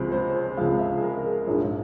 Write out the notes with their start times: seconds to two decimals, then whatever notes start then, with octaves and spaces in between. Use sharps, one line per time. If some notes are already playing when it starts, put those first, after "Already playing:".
Already playing: C#2 C3 F3 G#3 C5
0.12 C5
0.57 C#2 C3 F3 G#3 F5
0.79 E5
0.97 G#4
1.02 A#4
1.25 G#4
1.47 A#1 G#2 F3 G#3 C#5